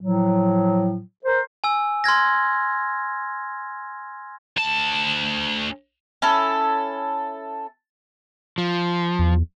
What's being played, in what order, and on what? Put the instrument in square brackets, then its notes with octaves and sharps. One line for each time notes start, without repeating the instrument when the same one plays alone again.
[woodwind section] A2 F3 F#3
A#4 C5
[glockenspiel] G#5 E6
C6 F6 G#6 A#6
[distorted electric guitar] D2 A5
[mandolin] C#4 E4 A4
[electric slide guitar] F3
[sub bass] E2